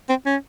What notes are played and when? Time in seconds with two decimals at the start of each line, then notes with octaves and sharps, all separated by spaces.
0.09 C4
0.26 C#4